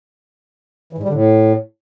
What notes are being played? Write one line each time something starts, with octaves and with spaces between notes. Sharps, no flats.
E3
G#2
G3
D3
A2